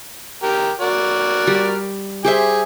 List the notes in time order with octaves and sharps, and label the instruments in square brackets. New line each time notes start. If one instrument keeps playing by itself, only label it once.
[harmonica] G4 A#4
F#4 A#4 D5
[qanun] G3
[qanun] G4 C5 E5 [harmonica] G#4